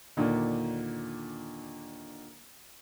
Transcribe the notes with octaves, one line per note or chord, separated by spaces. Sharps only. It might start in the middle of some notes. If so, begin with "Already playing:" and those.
D#2 A#2 D3